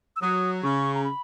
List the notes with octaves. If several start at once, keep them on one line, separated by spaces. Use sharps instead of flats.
E6
F#3 D#6
C#3 C#6
A#5
B5